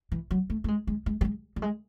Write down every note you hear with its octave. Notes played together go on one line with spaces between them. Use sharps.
E3
F#3
A3
A3
G#3
G#3
G#3
G3
G#3
G3
G#3